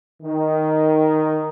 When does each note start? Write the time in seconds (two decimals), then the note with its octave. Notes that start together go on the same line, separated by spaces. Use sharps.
0.22 D#3